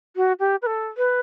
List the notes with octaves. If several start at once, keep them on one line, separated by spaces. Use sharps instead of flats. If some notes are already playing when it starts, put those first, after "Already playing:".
F#4
G4
B4
A4
B4